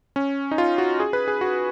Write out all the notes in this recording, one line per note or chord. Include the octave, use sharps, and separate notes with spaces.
C#4
D#4
F4
F#4
G#4
B4
G#4
F#4